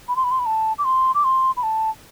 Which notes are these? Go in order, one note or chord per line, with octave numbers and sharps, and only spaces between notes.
B5
C6
B5
C6
B5
A5
D6
C6
D6
C6
B5
A5